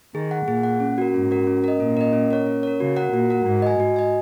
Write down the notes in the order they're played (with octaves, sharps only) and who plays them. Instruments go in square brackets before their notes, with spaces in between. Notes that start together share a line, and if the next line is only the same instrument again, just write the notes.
[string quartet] D#3 [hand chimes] G#4
[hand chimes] F#5
[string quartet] A#2 [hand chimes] G#4
[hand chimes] F#5
C#4
F#4 A#4
[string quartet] G#2 [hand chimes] C#4
[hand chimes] F#4 A#4
C#4
A#4 D#5
[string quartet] A#2 [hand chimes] C#4
[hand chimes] A#4 D#5
C#4
A#4 C#5
C#4
A#4 C#5
[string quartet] C#3 [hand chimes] F#4
[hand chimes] A#4 F#5
[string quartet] A#2 [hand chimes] F#4
[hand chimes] A#4 F#5
[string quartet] G#2 [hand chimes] F#4
[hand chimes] D#5 G#5
[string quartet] G#2 [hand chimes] F#4
[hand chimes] D#5 G#5